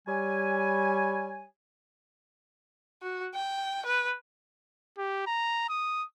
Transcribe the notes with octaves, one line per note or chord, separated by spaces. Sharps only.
G3 C#5 G#5
F#4
G5
B4
G4
A#5
D#6